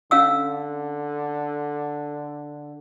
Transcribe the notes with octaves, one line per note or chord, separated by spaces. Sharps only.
D3 C#4 F5 E6